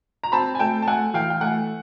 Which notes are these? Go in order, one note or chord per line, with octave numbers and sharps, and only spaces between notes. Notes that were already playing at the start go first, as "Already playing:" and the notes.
A#5
C4 A5 B5
G#5
A3 G5 A5
A5
A3 F#5 G#5
E3 F5 G5
G5
A3 F#5 G#5